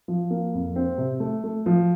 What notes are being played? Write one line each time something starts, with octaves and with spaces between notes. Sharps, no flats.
F3
A#3
F2
C4
C3
A3
A3
F3